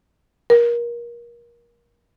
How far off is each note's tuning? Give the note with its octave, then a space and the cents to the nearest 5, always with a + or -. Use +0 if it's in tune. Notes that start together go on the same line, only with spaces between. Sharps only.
A#4 +25